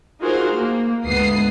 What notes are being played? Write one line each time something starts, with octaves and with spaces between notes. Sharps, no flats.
D#4 F4 F#4 G#4 A#4 C5
A#3
D2 G#2 B3 D#6 C7